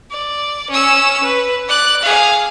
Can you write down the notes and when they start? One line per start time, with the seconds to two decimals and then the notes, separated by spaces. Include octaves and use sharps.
0.11 D5
0.70 C#4 E6
1.23 B4
1.68 D5 F#6
2.03 G#4 F5